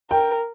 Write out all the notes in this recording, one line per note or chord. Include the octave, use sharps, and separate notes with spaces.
A#4 G5